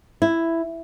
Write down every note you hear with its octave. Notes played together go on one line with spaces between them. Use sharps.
E4